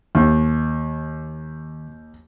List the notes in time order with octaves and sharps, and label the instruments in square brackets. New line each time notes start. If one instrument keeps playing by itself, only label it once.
[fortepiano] D#2 [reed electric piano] D#3